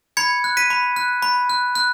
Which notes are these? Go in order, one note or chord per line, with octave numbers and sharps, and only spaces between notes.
B5 G#6 C#7
F#6
B6 D#7
B5
F#6
B5
F#6
F#6